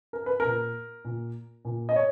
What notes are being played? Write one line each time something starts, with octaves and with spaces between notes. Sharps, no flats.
A#4
B4
A#2 A#4
A#2
A#2
D#5
C#5